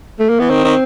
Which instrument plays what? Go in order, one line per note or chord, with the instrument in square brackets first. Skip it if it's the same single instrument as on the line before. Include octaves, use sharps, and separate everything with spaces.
[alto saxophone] A3
A#3
[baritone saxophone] E3 [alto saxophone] B3
[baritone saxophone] D#3 [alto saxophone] C4
[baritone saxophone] D#3